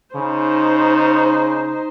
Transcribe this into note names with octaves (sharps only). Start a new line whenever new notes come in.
C#3 D#4 C5